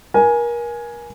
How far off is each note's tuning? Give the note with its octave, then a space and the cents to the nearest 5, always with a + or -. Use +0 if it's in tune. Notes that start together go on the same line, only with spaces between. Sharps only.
A#4 +30 G#5 +5